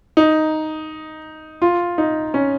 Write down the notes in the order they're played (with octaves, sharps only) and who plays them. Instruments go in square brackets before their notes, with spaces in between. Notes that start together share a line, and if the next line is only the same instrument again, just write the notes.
[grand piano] D#4
F4
D#4
C#4